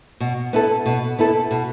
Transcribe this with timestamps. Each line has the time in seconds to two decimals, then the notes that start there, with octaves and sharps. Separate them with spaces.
0.20 B2
0.53 B3 E4 A4
0.86 B2
1.19 B3 E4 A4
1.51 B2